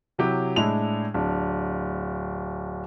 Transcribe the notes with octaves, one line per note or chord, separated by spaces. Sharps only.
C3 F#3 E4 G4
A2 G#3 D4 E4 F7
D1 D4